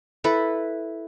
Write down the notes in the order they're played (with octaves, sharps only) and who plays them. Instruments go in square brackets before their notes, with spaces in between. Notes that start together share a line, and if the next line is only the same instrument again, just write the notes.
[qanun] E4 A4 B4